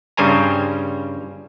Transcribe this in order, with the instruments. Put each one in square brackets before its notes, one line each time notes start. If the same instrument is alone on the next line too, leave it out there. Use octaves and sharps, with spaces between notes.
[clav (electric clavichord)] G2 C#3 G3 C5 G#5 A#5